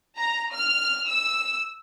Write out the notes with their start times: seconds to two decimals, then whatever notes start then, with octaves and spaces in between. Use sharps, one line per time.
0.18 A#5
0.54 F6
1.07 E6